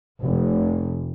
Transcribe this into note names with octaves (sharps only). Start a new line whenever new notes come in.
F1